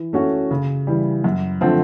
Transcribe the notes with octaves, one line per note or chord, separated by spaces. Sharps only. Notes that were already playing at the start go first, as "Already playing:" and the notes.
Already playing: E3
A3 C#4 F#4
C#3
E3 G3
F#2
D3 F3 A3 C4